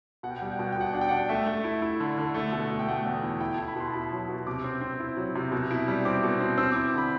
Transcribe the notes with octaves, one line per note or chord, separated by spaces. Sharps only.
B2 F#5
G5
F#5
G3 G5
F#5
B2 G5
F#5
G5
B2 F#5
G5
D4 F#5
G5
F#5
D4
A3 E5
A3
E4
E4
D3
D3
A3
B2
A3
G5
A3 F#5
E2
E4
E4 G5
A5
E4
B5
B2 C6
A5
E4 B5
F#3
B2
C3 D6
C4
C4
E4
F#3
C3
B2
E4
G3
C4 D6
B2
C4
C4 E6
D6
E4
D3 B5